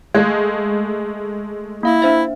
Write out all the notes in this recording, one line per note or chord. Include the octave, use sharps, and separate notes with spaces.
G#3 A3 F5 F#6 G#6
A#3 E4 F5
D4 C5 E5